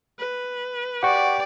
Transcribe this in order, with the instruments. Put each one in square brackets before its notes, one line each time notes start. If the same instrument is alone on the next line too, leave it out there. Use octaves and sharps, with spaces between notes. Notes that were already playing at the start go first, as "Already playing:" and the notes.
[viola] B4
[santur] G4 [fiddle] D5 [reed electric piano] F#5 C#6